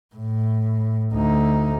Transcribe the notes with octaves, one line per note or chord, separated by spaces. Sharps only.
A2
D2 D#4